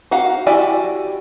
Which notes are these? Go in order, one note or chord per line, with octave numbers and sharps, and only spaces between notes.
D#4 F#4 F5 F#5
E4 F#4 G4 D5 G#5